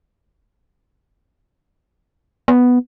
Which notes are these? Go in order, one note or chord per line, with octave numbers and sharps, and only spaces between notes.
B3